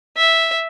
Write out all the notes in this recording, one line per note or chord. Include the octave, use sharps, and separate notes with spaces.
E5